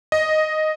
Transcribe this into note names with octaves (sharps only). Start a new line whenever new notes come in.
D#5